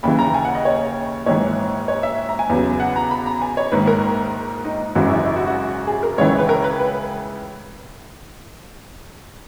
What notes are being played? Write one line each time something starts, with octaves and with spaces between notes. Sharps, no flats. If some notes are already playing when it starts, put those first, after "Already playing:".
D#2 C#3 E3 B5
A#5
G#5
F#5
D#5
C#5
A#1 G#2 E3 C#5
C#5
E5
A#5
G#5
E2 C#3 F#3
F#5
A#5
B5
A#5
G#5
C#5
A#1 G#2 D#3 B4
A#4
D#4
G#1 F#2 C#3 E3 F#4
E4
E4
F#4
F#4
G#4
A#4
C#2 C#3 E3 C#5
C#5
B4
A#4
B4
B4